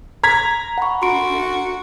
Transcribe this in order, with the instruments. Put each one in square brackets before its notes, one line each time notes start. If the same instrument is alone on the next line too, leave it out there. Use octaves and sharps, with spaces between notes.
[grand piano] A#5 G#6 B6
[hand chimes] F#5 B5 C#6
[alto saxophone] F#4 [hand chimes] C6 D7